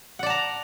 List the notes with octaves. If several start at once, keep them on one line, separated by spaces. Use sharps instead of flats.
D5 F#5 A5 A#5